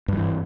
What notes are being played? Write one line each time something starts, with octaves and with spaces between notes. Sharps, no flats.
G2 E3 F3